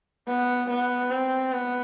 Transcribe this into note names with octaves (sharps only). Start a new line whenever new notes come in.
B3
B3
C4
B3